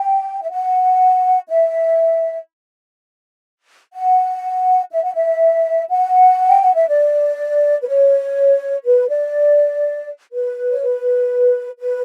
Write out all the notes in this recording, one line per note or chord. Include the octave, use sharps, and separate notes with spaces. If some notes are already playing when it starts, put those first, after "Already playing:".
Already playing: G5
E5
F#5
E5
F#5
E5
F#5
E5
F#5
G5
F#5
E5
D5
B4
C#5
B4
D5
B4
C#5
B4
B4